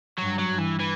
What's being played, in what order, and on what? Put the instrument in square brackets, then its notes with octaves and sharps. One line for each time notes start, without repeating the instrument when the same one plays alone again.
[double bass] G2 [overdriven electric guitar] F#3
[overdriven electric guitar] F#3
[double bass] G2
[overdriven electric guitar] E3
E3